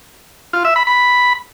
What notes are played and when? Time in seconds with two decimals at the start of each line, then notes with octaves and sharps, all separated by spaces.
0.53 F4
0.65 E5
0.76 B5
0.87 B5